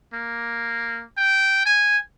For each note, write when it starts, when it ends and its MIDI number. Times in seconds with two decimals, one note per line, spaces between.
0.13 1.04 58
1.18 1.65 79
1.65 1.98 80